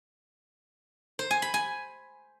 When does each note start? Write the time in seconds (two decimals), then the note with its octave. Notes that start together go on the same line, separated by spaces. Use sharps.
1.19 C5
1.31 G#5
1.42 B5
1.54 G#5